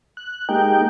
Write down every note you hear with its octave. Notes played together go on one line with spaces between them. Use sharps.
F#6
G#3 A#3 D#4 G4 G5